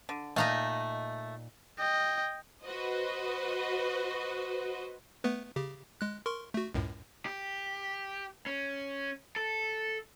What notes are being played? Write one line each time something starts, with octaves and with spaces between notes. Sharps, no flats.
D3
A#2 A3 D#4 D#5 F5
D#5 G5
F#4 B4 C5 D#5
A3 B3 B4
C#3 G4
G#3 F#6
A#4 C6 C#6
A3 F#4
C#2 F#2 A2
G4
C#4
A4